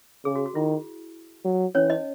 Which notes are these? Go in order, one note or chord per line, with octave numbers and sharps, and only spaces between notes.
C#3 G#4
F#4
F#4
D#3 E4
F#3
E3 C#4 C#5
D#4 D#5